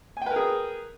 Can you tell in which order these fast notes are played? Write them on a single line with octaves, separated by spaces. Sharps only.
G#5 G5 B4 A#4 G#4